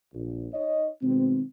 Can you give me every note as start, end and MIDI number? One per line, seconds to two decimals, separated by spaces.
0.14 0.47 34
0.53 0.87 63
0.53 0.87 73
0.53 0.87 75
1.02 1.42 47
1.02 1.42 51
1.02 1.42 56
1.02 1.42 60